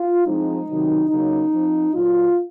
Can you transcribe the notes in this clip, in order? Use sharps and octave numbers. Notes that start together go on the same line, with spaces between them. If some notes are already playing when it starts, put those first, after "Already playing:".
Already playing: F4
F3 G#3 C4 D#4
C3 D#3 F#3
C#3 F#3 A#3 C#4 D#4
F3 C4
A#2 F#3 A#3 F4